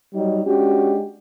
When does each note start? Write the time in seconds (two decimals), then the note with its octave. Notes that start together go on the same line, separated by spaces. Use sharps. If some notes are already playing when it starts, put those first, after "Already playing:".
0.14 F#3 G3 D#4
0.46 G#3 C#4 D4 F#4 G4